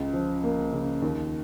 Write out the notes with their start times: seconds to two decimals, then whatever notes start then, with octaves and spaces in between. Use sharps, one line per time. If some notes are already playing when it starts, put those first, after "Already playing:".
Already playing: C#2
0.13 F3
0.44 A#3
0.73 C#3
1.02 D#2